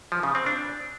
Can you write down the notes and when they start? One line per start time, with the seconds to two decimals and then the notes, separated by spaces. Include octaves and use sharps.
0.12 F3
0.23 C#3
0.35 C4
0.46 D4